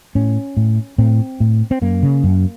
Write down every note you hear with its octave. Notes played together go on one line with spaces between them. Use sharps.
A2 C#4
A2
A2 C4
A2
C4
F#2 A#3
C#3
F#2